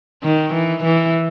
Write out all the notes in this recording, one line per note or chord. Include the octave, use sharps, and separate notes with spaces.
D#3
E3
E3